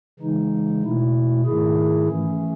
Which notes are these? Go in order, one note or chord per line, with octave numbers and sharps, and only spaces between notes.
C#3 E3 G#3 D#4
B2 A3 E4
G#2 D#3 A3 E4 G#4
E3 A3 C#4